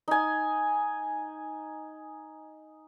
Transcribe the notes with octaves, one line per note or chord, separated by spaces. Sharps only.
D#4 G#5